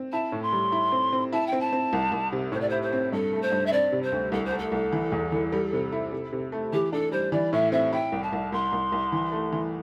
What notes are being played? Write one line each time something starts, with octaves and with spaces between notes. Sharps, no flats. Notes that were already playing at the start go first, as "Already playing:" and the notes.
Already playing: C4
E4 A5
A2
C6
G3
E4
C4
C4
E4 A5
G5
C4
A5
C4
C2
C2
C3
A2 C5
D5
E4 C5
C5
C4
G2 A4
A3
C5
G2
E5
C4 D5
C3
C5
D2
C2 A4
C5
A3
A4
C2
E3
E2
E3
G3
C3
E4
C3
C3
A3
E3 G4
D4 A4
G3 C5
E3 D5
A2 E5
C4 E5
E4 G5
C2
A5
C2
C2 C6
C2
C2
E3
A3
E3